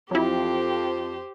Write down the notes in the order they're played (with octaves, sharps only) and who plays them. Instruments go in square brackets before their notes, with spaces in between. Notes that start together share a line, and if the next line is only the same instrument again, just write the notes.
[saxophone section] F2 [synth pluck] F#3 E4 [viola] G4 C5